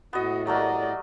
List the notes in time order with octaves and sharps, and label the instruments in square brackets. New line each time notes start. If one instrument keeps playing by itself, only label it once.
[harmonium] A2 [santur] B3 D#5 [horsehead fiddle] F#4
[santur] F#3 A3 A#4 [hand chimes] G4 F#5 [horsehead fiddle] D5 D#5